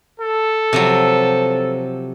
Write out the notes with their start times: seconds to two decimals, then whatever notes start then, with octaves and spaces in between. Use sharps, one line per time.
0.20 A4
0.73 C3 F3 F#3